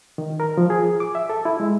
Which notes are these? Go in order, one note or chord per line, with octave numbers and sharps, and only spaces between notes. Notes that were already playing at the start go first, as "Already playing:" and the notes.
D#3
A#4
F3
G#4
D6
E5
A4
E4
G#3